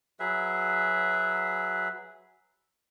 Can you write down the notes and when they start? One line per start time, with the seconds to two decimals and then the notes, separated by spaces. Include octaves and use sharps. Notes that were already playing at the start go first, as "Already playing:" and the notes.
0.19 F#3 G#4 B4 E5